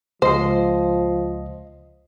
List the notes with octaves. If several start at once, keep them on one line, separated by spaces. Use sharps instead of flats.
C#2 F3 C5 D#5 C7